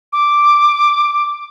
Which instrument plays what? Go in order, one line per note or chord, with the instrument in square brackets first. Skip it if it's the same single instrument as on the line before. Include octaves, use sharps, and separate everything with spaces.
[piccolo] D6